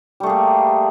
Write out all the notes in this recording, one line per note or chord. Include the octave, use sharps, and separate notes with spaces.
G3 A3 A#3 G#4